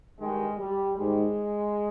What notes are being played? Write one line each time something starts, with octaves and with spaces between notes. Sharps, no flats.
G2 D#3 G3 G#3
G3
G#2 D#3 G3 G#3